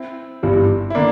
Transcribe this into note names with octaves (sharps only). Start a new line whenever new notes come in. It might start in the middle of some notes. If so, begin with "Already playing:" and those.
Already playing: C4 E4
G1 G2 E3 G3
E4
D3 A#3 D4